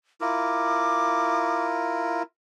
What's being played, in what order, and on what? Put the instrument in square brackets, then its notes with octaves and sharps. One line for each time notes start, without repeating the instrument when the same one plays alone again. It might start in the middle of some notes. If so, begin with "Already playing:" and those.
[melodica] E4 F4 A#4 [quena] D6